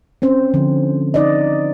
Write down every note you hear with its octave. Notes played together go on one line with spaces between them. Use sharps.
C4 C#4 C5
D3 F3
D#4 D5 D#5